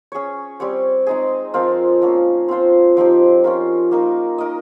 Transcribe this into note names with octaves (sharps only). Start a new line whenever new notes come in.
C#4 G#4 C#5
G3 C4 G4 C#5
G#3 C4 D#4 G#4
F3 C4 F4 A#4
F3 A#3 C#4
C4 F4 C5
F3 C4 D#4 G4
C#4 F4 A#4
A#3 D#4 A#4
D#4 A#4 D#5